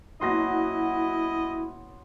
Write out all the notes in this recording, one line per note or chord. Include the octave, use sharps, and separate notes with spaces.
F#1 F#3 B3 E4 F#4 D#5 C6 A#6